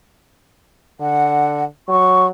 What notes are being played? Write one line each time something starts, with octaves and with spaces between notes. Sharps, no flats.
D3 F#5
F#3 C#6